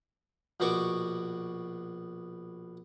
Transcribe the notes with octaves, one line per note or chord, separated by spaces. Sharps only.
A#1 B2 B3 F#4 C#6 D6